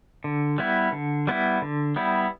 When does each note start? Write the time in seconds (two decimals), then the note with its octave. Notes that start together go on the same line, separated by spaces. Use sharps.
0.24 D3
0.58 G3 B3 E4
0.92 D3
1.27 G3 B3 E4
1.62 D3
1.96 G3 B3 E4